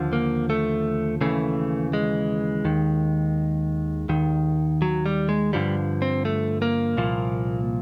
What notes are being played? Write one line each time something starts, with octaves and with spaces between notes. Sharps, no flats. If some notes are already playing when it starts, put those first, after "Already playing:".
Already playing: D#2 D3 F3
A#3
A3
D#2 C#3 E3 A3
G#3
D#2 D#3
D#2 D#3
F#3
G3
G#3
G2 D3 F3 G3
C4
A3
A#3
C2 A#2 F3